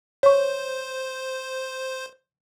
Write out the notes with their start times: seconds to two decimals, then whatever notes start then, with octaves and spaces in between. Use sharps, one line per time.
0.23 C5 C#5 C#6